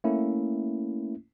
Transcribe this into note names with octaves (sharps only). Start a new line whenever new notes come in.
A3 A#3 C#4 E4